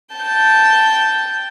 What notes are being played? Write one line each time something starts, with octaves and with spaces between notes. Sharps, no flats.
G5 A5 G6